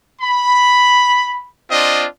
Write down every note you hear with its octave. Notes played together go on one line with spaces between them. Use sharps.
B5
C4 D4 F4 D#5